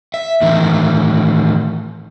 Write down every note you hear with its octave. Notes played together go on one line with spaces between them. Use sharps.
E5
A2 D#3 E3